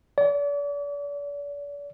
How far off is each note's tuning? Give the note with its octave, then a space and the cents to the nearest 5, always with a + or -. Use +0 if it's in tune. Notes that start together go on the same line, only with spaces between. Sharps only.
D5 -40